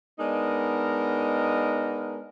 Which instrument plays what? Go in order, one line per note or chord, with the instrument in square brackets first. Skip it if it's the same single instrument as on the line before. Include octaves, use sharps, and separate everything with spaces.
[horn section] G#3 B3 D4 D#4 A#4